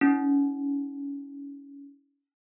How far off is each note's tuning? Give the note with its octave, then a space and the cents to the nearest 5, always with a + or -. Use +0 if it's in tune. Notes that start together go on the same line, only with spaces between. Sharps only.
C#4 +20 E4 -45